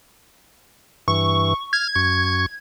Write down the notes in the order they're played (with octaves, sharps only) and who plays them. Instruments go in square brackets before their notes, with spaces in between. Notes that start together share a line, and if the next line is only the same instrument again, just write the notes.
[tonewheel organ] G2 E3 [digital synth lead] C#6
[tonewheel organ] F6 [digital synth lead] G#6
[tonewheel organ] F#2 C#6